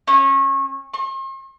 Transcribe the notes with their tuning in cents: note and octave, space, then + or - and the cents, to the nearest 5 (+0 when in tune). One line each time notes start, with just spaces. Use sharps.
C#4 -30
C6 +45